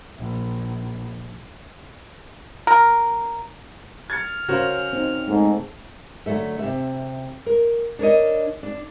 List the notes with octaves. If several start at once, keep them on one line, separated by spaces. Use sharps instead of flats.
A#1
A#4
F6 G#6 A6 C#7
C#3 C#4 F#4 A#4 C5 F5
C4 D#4
G#2 A3 G#4 A4
D3 F#3 A3 E5
C3 E5
A#4
D4 A#4 C#5 D#5
D4